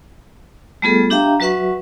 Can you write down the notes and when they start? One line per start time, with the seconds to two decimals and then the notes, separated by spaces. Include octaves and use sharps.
0.82 G3 A3 B3 F4 G#4 A4
1.10 D4 G4 E5 F5 G5 A#5
1.40 F#3 F#4 B4 E5 F#5 C#6